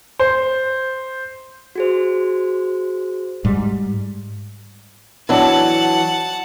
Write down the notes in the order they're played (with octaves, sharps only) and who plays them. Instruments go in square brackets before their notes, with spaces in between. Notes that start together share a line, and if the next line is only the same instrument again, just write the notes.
[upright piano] C5
[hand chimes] F#4 G#4 C5
[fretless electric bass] G#2 G3
[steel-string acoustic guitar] E3 F#3 D4 [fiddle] F#5 A5